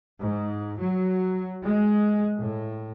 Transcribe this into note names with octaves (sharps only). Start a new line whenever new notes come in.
G#2
F#3
G#3
A2